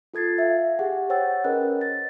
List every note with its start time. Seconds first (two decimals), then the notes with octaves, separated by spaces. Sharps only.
0.14 F4 A4 G#6 A6 C7
0.38 E5 F5
0.79 G4 G#4 F#5
1.10 C5 C#5 F#5 G5 E6 A6
1.44 C#4 G#4 A#4 B4 D#5 F#6
1.81 A6